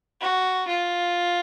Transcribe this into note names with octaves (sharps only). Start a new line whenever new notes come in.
F#4
F4